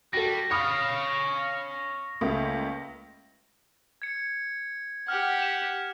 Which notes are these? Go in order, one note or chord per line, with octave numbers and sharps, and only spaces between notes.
G3 F#4 A4 A#6
C#5 F5 B5 D#6 F6
C#2 A3 A#3
G#6 C#7
G4 F#5 F6
E7